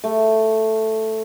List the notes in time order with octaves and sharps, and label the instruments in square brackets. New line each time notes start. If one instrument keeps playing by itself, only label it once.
[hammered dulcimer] A3